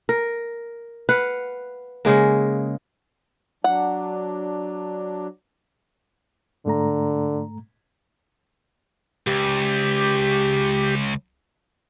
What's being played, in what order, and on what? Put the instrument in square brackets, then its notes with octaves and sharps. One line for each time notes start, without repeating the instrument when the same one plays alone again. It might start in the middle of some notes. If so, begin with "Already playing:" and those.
[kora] A#4
B4 F5 F#5
C#3 G#3 A#3
[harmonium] F#3 D4 [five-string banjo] F#5
[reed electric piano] G#2 A3 A#5 [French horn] D3
[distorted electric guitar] C#2 [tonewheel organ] G4